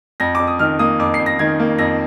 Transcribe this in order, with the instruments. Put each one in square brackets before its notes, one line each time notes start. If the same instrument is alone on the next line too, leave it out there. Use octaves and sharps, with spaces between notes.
[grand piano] F2 A#6
F2 D6
D#6
D#3 F6
A#3 D#6
F2 D6
C7
F2
A#6
D#3 G#6
A#3
F2 A#6